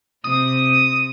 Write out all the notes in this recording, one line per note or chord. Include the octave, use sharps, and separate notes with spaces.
C3 D#6